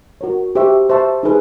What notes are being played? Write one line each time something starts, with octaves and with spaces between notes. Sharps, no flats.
F#4 A#4 C#5
G4 C5 E5 A5 C#6
C5 E5 A5 C#6
D#4 G#4 B4